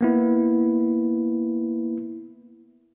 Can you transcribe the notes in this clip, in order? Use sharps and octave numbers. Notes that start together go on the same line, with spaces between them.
A#3 B3 E4